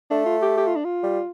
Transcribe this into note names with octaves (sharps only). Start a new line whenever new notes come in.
A3 D4
F4
G4
G4
F4
D4
F4
G3